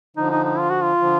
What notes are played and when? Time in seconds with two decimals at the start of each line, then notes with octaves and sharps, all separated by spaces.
0.16 D3 F3 D#4
0.31 D#4
0.44 D#4
0.59 F4
0.70 F#4
0.83 F4
1.00 D3 F3